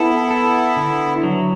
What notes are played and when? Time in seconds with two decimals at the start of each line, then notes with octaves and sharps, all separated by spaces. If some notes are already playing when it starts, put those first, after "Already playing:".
Already playing: B3 E4 A4
0.31 A4
0.77 D3
1.23 F#3